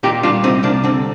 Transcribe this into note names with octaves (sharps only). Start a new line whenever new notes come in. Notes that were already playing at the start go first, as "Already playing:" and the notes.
A#2 D#4 G4
G3 D4 F4
C2 C4 D#4
C2 A#3 D4
D3 C4